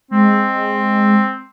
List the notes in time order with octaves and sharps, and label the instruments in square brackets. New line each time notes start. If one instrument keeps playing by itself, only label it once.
[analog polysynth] G#3 [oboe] C4